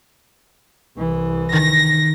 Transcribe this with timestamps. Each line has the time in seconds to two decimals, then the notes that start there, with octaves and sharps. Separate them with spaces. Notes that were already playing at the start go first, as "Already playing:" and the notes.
0.97 C2 E3
1.53 D#3 A#6